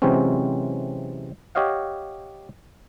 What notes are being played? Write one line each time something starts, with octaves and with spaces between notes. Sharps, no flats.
C3 E3 F#3 G#3 C4 C#4
G4 C#5 D#5 F5 F#5